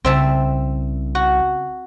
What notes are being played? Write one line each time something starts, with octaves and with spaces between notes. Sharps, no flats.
C2 C#3 C4 E5 A5
F#4